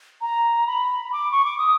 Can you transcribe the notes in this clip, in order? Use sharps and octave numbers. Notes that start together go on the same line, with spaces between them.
A#5
B5
D6
C#6
D6
D#6